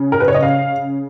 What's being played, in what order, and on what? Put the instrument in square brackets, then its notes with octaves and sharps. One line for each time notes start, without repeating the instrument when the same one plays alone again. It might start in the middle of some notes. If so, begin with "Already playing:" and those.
Already playing: [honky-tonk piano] C#3
A#4
B4
C#5
D#5
F5